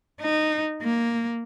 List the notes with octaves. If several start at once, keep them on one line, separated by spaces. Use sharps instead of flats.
D#4
A#3